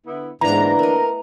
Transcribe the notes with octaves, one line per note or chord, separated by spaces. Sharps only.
D3 B3 E4
G#2 D3 E3 A#3 B3 D4 A#5
A3 A#4 D#5